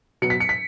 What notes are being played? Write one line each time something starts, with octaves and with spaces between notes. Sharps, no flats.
B2 F#3 B3 C#7
B6
C#7
B6